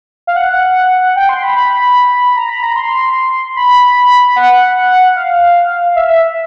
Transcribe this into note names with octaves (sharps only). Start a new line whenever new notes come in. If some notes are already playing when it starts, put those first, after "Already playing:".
F5
F#5
G5
C6
B5
B5
A#5
B5
A#5
C6
B5
F#5
F5
E5